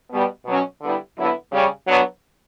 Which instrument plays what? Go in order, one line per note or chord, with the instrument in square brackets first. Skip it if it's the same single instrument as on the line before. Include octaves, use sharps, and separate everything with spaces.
[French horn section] B2 G3 B3
B2 F#3 C#4
D3 G3 B3 E4
D3 F#3 B3 E4
C#3 G3 C#4
F#3 B3 D4